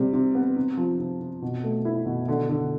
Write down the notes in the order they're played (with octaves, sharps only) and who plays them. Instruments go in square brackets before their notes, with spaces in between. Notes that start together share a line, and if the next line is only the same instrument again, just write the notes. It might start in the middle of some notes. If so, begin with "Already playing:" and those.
Already playing: [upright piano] C3 G3
C3
B3
C3
F3
C3
C3
B2
A3
E4
B2
D3
D3